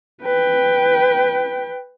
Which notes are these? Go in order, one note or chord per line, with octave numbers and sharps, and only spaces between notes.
B4 G5